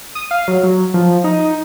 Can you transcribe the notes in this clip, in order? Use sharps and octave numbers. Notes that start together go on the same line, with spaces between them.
D#6
F5
F#3
F#3
F3
D#4